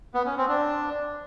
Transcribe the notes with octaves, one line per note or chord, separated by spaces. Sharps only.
B3
C#4
C4
D4